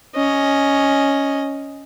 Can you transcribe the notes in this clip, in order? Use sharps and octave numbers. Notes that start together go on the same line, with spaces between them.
C#4 D#5